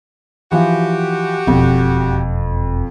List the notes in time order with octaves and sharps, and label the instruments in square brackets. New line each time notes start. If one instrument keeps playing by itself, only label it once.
[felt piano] E3 F3 [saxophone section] F#4 G4
[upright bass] E1 [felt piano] F2